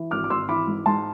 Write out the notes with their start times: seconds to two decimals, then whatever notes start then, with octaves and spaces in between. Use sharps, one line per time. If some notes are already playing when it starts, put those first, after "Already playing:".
Already playing: E3
0.11 G#1 D6 F6
0.24 D6
0.30 G#1 C6 E6
0.49 E3 B5 D6
0.67 G#2
0.86 G#2 A5 C6